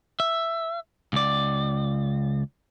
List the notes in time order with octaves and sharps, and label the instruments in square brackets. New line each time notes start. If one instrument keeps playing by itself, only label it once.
[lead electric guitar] E5
C#2 D5